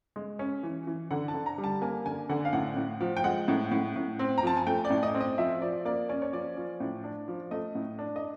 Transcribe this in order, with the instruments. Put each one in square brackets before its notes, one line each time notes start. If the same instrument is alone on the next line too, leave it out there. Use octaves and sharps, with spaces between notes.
[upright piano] G#3
C#4
E3
E3
D3 F#5
A5
D3
A#5
G3
A5
A#3 G#5
D3 G#5
D3 F#5
F5
A2 F#5
A2
F3
G5
G#3 F#5
A2
A2
A2
C4
A#5
F3 A5
G#5
A3 G5
D5
A2
D#5
C4
D#5
F3 E5
F3 D5
A#3 D5
C#4 D5
C#5
F3 D5
F3
A2
D4
F3
A3 D#5
A2
D4
D#5